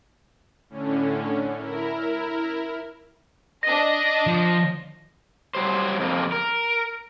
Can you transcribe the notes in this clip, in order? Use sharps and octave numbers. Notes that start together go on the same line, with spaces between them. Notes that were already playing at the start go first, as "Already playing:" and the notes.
A2 D3 C#4
E4 A#4
D4 D#5 A#6
F3
F#3 G3 C5
F2 C3 A#3
A#4